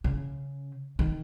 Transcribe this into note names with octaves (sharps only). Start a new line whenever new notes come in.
C#3
D#3